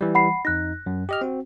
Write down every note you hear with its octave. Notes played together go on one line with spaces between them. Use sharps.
E3 G3
F#5 B5 C7
F2 D#4 F#6 A#6
F#2
G4 D#5 F6
C4 F#4